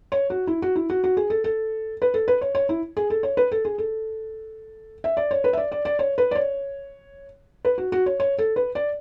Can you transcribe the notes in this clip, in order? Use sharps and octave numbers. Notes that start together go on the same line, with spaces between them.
C#5
F#4
E4
F#4
E4
F#4
F#4
G#4
A4
A4
B4
A4
B4
C#5
C#5
E4
G#4
A4
C#5
B4
A4
G#4
A4
E5
D5
C#5
B4
E5
D5
D5
D5
C#5
B4
D5
C#5
B4
F#4
F#4
C#5
C#5
A4
B4
D5